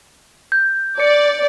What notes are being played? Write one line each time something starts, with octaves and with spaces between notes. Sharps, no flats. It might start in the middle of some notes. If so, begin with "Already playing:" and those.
G6
D5 C#7